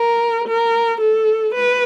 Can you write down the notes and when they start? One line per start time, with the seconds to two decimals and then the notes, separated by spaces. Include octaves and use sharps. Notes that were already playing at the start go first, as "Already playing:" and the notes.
Already playing: A#4
0.48 A#4
1.01 A4
1.55 B4